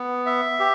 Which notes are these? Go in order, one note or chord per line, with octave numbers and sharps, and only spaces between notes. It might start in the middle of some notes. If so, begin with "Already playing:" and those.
Already playing: B3
E5
G4